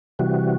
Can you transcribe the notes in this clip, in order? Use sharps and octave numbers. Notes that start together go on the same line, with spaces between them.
C3 E3 G3 F#4